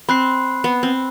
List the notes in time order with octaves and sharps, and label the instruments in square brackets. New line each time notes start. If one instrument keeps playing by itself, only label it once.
[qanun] C4 [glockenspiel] B5 F#6 C7
[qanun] B3
C4